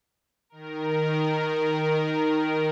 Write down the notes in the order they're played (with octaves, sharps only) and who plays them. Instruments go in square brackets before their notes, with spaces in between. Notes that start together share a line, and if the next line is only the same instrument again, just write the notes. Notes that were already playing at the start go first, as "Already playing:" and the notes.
[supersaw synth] D#3 A#4